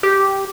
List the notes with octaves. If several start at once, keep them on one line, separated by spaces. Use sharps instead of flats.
G4